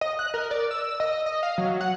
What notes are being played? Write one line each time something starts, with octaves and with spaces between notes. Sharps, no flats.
D#5
F#6
A#4
D5
E6
D#5
D#5
F5
F#3
F#5